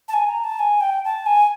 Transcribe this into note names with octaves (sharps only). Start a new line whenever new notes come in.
A5
G#5
A#5
A5
G#5
G5
A5
G#5